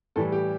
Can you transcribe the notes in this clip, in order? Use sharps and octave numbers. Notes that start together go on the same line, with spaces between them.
A2 E3 G3 A4
G4